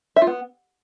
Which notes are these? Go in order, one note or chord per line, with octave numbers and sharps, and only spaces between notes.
E5
F4
B3